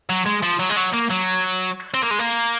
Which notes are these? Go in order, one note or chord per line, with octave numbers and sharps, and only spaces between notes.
F#3
G#3
F3
F#3
G#3
F#3
A#3
F#3
C4
A#3
G#3
A#3